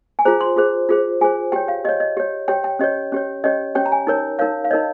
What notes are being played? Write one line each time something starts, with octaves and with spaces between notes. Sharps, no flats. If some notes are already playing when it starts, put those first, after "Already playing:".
G#5
F4 G#4 C5 A#5
C6
F4 G#4 C5
F4 G#4 C5
F4 G#4 C5 G#5
G4 C#5 G5
F5
G4 C#5 D#5
D#5
G4 C#5
G4 C#5 G5
G5
C#4 G4 C#5 D#5
C#4 G4 C#5
C#4 G4 C#5 D#5
C#4 G4 C#5 G5
A#5
G#5
D#4 A#4 C#5
D#4 A#4 C#5 F5
F5
D#4 A#4 C#5 D#5